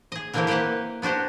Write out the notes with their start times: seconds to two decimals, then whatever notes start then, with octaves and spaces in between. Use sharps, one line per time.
0.12 G#4 D#5
0.34 D3 E3 A#3 C4 E4 G4
0.47 A#3 G4 B4 C5 F#5
1.02 B3 D4 F#4 G4 C5